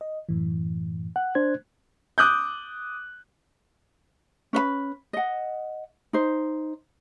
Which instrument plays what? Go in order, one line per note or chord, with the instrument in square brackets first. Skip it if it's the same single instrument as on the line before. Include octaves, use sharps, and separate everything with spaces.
[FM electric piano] D#5
F#2 A2 E3
[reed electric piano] F#5 [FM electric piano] F#6
[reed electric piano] D4 C5 G#6
[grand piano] D6 D#6 F#6 G6
[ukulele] C#4 B4 D#5 B5
D#5 F#5
D#4 C5